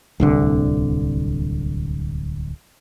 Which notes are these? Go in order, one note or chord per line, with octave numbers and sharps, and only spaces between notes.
D1 C2 D3